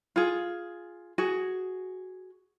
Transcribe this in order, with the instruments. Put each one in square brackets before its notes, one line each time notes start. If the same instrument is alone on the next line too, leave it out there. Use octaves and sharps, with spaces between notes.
[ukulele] F4 G#4
F#4 G#4